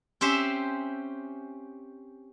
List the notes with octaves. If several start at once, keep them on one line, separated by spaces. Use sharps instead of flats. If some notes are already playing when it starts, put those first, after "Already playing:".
C4 C#4 G4 C5 E5